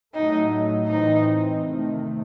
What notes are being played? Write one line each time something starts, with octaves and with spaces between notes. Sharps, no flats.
A2 F#3 A3 D#4
A2 E3 C4 D#4
C3 D#3 A3